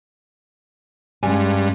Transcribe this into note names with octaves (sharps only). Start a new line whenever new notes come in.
G2 G#3 C#4 G#5